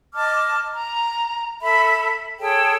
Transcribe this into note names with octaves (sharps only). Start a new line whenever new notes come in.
D#5 A5 D6 F6
A#5
A4 E5 B5
G#4 A4 C#5 G5